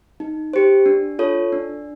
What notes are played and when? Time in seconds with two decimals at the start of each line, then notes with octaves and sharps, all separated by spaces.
0.20 D#4
0.53 G4 C5
0.86 D4
1.19 F4 A4 C#5
1.53 D4